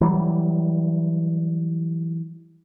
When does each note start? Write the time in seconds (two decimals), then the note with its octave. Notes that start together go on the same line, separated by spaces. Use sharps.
0.01 E3 F#3 G3